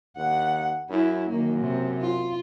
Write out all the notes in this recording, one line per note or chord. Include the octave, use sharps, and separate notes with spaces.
D#2 F#5
F#2 E4
F#2 D#3 A#3
C3
F4